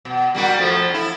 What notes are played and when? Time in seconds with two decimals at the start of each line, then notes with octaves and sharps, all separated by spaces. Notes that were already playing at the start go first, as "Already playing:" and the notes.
0.05 B2
0.35 G3 A#3 F#4
0.58 F2 F3 A3
0.94 E4